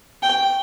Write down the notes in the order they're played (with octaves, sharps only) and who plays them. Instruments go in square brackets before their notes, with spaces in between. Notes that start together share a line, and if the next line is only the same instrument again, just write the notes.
[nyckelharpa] G5